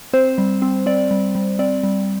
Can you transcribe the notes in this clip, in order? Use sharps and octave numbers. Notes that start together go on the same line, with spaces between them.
C4 C5
G3
C4
C4 D5
G3
G3
C4 D5
G3